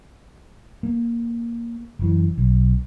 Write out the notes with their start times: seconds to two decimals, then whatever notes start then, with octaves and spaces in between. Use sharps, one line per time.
0.83 A#3
1.99 F#1 E3
2.37 B1